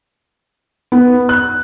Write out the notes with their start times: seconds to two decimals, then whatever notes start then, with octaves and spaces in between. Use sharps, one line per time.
0.92 B3
1.29 F#6